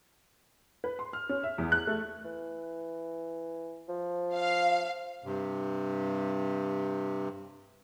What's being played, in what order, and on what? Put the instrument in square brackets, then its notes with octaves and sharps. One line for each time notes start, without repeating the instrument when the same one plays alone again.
[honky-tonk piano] B4
C6
F6
C#4
E5
E2
F#6
A3
[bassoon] E3
F3
[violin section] F5
[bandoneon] G2 C3